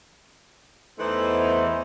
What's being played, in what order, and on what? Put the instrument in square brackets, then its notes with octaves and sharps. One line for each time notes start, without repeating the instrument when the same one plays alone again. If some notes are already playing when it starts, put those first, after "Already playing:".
[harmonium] E2 C5 [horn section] E3 A3 D#4